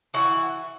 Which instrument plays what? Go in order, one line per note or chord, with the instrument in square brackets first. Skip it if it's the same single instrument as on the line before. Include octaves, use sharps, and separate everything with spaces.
[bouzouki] E3 F#4